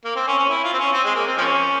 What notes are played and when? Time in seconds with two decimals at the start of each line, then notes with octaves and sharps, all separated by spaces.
0.05 A#3
0.16 C4
0.27 C#4
0.38 C#4
0.49 E4
0.64 F4
0.73 C4
0.78 C#4
0.93 C4
1.04 G#3
1.15 A#3
1.26 C4
1.38 F3 A#3 C#4